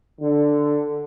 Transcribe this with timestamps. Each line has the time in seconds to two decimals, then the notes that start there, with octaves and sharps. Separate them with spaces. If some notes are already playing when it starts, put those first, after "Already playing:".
0.20 D3